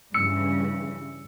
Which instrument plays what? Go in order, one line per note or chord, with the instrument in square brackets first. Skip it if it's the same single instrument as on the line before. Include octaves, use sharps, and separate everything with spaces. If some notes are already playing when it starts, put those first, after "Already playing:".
[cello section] G2 C#3 E3 [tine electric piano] E6 C#7